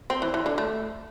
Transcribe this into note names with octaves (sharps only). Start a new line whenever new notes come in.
C4
E3
E3
D3
A3